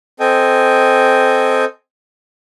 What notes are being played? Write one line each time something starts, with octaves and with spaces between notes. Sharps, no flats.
C4 A4 D#5 G5 G#5